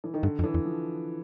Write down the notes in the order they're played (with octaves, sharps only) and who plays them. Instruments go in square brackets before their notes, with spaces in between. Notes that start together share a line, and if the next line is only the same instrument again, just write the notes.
[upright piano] E3
D#3
[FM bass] G2 [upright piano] D3
[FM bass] F2
[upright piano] E3
[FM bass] E2
[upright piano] F3